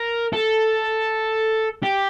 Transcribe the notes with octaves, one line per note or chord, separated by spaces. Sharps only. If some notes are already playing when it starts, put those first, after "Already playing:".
Already playing: A#4
A4
G4